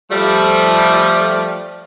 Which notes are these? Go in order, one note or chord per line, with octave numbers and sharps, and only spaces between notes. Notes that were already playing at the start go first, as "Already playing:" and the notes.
F3 G3 A3